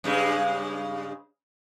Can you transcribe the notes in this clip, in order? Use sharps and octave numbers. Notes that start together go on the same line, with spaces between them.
G2 C#3 G#3